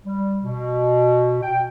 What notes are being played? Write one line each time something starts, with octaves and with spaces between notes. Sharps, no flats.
G3
B2
G5